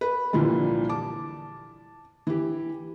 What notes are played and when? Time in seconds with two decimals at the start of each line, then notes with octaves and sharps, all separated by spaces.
0.01 B4
0.33 C2 A#2 D3 E3 F3 G3
0.89 A5 D6
2.27 E3 G4